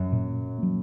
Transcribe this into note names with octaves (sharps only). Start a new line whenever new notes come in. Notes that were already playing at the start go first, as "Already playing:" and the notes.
Already playing: F#2
A#2
F#3 A#3